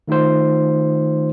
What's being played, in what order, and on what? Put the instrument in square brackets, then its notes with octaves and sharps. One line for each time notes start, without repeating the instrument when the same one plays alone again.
[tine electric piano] D#3 A3 D#4 F4 C5